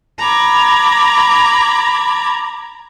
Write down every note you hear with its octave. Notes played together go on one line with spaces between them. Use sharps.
A#5 B5 D6 G#6